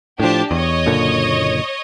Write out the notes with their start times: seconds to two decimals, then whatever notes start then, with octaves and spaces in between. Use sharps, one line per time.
0.20 A2 F3 D4 G4 A5
0.51 E2 C#5 D#5
0.86 F#1 A#2 D3